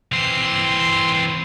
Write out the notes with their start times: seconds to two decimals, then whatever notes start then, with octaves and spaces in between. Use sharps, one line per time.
0.12 E3 C4 C6